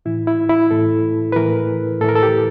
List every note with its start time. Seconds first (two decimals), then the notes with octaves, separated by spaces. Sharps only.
0.05 A2 E3 E4
0.27 E4
0.49 E4
0.71 A2 E3 A4
1.32 B4
1.36 A2 E3 A#4
2.01 A2 A4
2.04 E3 A#4
2.16 A4
2.23 G4